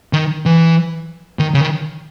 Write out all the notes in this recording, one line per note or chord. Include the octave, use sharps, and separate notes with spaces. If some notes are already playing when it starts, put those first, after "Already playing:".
D#3
E3
D#3
C#3
D#3